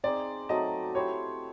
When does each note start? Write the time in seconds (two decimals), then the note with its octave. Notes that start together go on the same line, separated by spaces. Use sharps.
0.03 C4 D#4 G#4 D5
0.49 F#3 A3 C4 D#4 D#5
0.95 E4 G4 C5 C#5